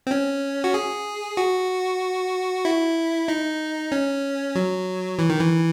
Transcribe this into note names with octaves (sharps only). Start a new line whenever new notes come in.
C4
C#4
F#4
G#4
F#4
E4
D#4
C#4
F#3
E3
D#3
E3